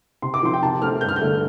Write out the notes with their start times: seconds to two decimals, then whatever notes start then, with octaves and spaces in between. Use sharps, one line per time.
0.22 C3 C6
0.34 D6
0.43 F3 C4 C6
0.54 G5
0.62 C3 A5
0.82 A3 C4 F6
1.01 G2 G6
1.09 F6
1.16 G6
1.21 D3 A3